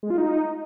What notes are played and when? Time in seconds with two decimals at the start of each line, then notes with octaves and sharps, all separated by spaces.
0.03 G#3
0.10 F4
0.18 D#4